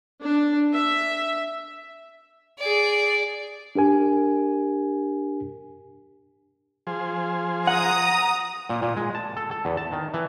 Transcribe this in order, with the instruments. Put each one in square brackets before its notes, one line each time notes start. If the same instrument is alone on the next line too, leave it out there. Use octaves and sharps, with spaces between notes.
[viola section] D4
E5
[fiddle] G#4 D5
[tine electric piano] D4 G4 A#4 G#5
[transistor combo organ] F3 G#4 C5
[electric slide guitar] F#5 [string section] A#5 D#6
[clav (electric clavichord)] A#2
A#2
G#3
A5
A4
A4
E2
A5
D#3
E3